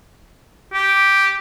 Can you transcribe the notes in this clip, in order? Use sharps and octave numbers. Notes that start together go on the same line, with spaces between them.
G4